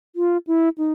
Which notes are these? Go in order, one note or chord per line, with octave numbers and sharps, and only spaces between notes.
F4
E4
D#4